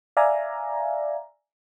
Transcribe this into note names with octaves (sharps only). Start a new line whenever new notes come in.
D5 E5 F5 G#5 A#5